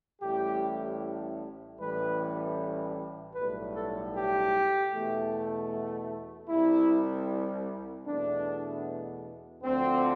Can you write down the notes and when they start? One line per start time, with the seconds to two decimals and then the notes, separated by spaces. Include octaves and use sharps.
0.21 A1 A2 G3 G4
1.78 A1 A2 E3 G3 B4
3.35 B1 A2 G3 B4
3.75 A4
4.14 G4
4.92 E2 B2 A3
6.49 C2 C3 G3 E4
8.06 E2 B2 A3 D4
9.63 D2 D3 F3 C4